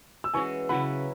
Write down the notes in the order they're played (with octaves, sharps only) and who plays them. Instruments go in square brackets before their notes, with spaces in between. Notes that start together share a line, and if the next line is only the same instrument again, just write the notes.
[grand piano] E6
[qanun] E3 G#3 C#4 F#4 [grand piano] G#5 C#6
[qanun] C#3 F#3 E4 B4 [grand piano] F#5 B5